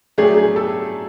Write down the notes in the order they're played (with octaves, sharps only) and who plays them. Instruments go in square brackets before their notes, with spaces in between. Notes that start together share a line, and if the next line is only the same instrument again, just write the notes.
[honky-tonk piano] F#3 A3 D4 G4 [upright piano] G#4
[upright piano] G#4
A4